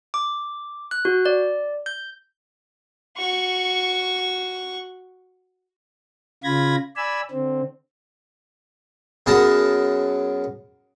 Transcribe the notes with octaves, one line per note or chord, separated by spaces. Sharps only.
D6
F#6
F#4
D5
G6
F#4 C#6
C#3 F4 B5 G#6 A#6
D5 G#5 B5 E6
D3 C4
F#2 B3 G#4 A#4 A5 A#5